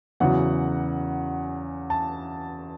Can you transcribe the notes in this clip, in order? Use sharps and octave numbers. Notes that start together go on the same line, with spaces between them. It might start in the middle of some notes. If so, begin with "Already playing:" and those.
E2 C#3 F#3 F#5
A5